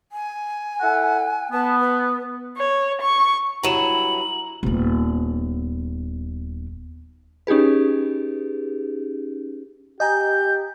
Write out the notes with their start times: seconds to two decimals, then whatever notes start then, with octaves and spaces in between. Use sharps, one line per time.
0.12 G#5
0.81 E4 A4 F#5
1.52 B3 A5
1.79 B4
2.57 C#5
3.02 C#6
3.63 G2 F#3 E4 A#5 D#7 E7 F#7
4.63 D#1 B3
7.47 C#4 D#4 G4 G#4 B4
10.00 G4 D#5 G#5 A#5 G6